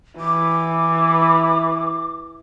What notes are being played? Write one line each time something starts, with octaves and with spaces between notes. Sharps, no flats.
E3 D6